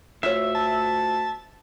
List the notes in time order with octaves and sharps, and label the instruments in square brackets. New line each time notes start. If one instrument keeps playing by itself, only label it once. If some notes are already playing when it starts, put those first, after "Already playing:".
[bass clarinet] D2 [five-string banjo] F4 C#5 [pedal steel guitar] E5
[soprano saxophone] A5